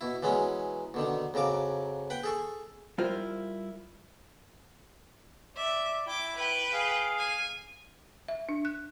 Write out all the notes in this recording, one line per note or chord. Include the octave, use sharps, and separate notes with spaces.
B2 E4
E3 F#3 G#3 B3 C#4
B2 D3 D#3
F2 C#3 F#3 A#4 D6
B4 F#5 G5
G#4 A4 C#6
G3 E4 F4 A#4 C5
D5 E5
E4 G5 D6
B4 G5
G#4 F5
G#5
E5
D4
F#6